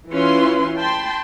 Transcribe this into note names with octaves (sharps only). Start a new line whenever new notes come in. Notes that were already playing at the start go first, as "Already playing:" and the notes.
E3 C#4 E4 F4 B4 C6
G5 A5 B5 C6